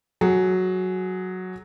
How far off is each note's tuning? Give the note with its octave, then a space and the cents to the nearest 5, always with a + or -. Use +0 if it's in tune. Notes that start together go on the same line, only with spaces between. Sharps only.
F#3 +0 G#4 +10